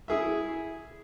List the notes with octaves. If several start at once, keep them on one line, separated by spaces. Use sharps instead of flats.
E4 G#4 E5